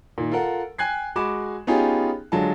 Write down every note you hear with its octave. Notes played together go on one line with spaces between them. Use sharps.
A#2 D#3
F4 A4 A#4 F#5
G5 G#5 F#6 G#6 C7
G#3 F#4 G#5 B5 D6 E7
B3 C#4 D#4 F4 G4 G#4
D3 F#3 G#3 F4 A5